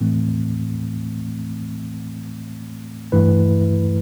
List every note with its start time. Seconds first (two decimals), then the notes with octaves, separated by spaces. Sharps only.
0.01 A2 E3 A3 C4
3.12 G2 E3 A3 E4 B4